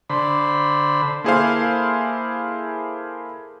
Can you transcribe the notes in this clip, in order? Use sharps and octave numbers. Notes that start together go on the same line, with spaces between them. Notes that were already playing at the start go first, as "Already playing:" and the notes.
D3 C5 B5
A#3 E4 G#4 A4 C5 F5